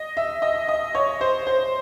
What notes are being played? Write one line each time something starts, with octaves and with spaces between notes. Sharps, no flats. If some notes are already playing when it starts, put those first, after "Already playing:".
Already playing: D#5
E5
D#5
D#5
C#5
C5
C5